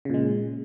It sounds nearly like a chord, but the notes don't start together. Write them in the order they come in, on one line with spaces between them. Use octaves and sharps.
C#3 A#2 G#3